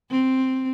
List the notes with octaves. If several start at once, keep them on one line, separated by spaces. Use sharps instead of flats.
C4